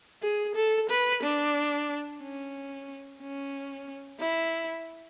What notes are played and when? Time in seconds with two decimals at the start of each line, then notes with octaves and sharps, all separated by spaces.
0.23 G#4
0.55 A4
0.89 B4
1.23 D4
2.22 C#4
3.21 C#4
4.20 E4